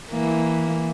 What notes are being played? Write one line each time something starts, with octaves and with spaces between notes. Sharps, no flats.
E3 A#3